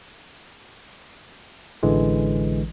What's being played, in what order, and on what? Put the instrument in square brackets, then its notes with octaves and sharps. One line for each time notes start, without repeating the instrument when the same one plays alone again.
[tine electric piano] A1 D3 E3 G#3